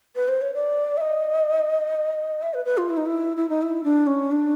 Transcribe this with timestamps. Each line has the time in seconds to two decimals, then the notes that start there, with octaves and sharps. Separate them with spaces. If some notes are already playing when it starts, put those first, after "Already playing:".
0.15 B4
0.28 C5
0.41 C#5
0.54 D5
0.97 E5
1.01 D#5
2.42 E5
2.54 B4
2.65 B4
2.77 F4
2.90 E4
2.97 D#4
3.06 E4
3.37 E4
3.49 D#4
3.62 E4
3.84 D4
4.07 C#4
4.31 D4